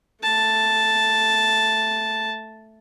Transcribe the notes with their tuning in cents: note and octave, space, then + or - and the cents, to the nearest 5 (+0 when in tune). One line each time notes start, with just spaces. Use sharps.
A3 +0 A5 +0